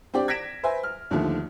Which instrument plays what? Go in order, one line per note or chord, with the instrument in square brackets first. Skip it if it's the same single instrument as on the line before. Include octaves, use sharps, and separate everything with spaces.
[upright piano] C4 D4 G4 D5
G#6 A#6 B6 D7 E7
B4 C5 E5 G#5
F6
D#2 D3 D#3 F3 A3